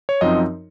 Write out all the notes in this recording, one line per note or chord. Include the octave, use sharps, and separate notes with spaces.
C#5
F#2 F3 C4 D#4 D#5